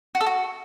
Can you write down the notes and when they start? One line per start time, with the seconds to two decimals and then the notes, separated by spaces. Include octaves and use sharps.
0.15 F#4
0.21 A4
0.26 F#4